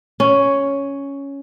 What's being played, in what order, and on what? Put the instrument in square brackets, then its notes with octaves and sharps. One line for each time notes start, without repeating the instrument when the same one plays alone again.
[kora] C#4